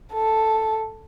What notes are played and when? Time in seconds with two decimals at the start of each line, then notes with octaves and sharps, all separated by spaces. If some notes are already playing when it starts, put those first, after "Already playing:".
0.13 A4